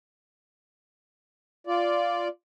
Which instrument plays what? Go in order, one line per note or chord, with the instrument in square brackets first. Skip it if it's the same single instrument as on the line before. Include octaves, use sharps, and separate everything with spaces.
[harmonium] F4 D5